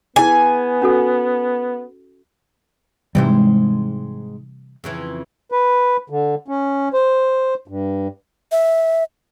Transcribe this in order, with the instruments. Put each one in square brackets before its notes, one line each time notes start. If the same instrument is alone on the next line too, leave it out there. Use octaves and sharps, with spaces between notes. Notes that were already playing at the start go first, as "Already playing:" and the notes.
[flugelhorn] B3 [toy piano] E4 G#4 [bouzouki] G#5
[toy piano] C#4 F#4 A4
[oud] G#2 G#3 C4 [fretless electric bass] C3 E3 G3
[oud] F2 C#3 E3
[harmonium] B4
D3
C#4
C5
G2
[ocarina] E5